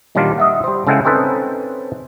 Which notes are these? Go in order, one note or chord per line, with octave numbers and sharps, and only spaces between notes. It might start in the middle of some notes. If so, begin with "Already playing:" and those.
A#2 D#3 F#3 G3 D4 F4
D#5 E5 F#5
G3 C5
C#3 G#3 E4 A4 F#5 G5
C4 C#4 D#4 A4 B4 C5